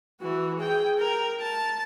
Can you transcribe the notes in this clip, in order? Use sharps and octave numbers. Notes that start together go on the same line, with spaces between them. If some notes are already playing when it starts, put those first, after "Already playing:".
E3 F#4
G#4 G5
A#4
A5